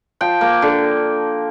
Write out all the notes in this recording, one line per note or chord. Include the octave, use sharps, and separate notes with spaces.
F3 G5
A#3
D3